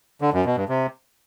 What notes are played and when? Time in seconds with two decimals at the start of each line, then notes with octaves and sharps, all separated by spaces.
0.21 D3
0.33 F#2
0.45 B2
0.57 G2
0.69 C3